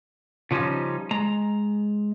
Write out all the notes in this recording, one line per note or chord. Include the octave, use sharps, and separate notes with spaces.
C#3 F3 G3 C#4 D#4
G#3 A#5